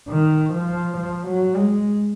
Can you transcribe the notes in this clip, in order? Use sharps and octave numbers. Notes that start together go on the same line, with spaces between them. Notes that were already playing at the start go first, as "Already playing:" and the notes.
D#3
F3
F3
F#3
G#3